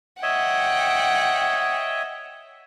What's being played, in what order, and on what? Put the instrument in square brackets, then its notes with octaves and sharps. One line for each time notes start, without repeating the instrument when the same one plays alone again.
[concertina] C#5 D#5 E5 [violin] F#5 G5